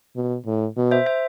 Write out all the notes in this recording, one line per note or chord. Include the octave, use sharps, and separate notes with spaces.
B2
A2
B2
C5 E5
C5 E5